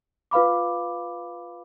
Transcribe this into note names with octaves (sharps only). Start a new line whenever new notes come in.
F4 B4 F5 B5 D6